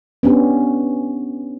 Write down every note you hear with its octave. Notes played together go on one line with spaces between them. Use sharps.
B3 C#4 D4 G4